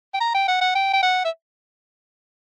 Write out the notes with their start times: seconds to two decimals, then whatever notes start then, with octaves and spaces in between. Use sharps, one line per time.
0.14 G5
0.20 A#5
0.34 G5
0.48 F#5
0.61 F#5
0.75 G5
0.93 G5
1.02 F#5
1.25 E5